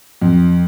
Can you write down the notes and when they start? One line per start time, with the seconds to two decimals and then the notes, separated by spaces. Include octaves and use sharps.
0.22 F2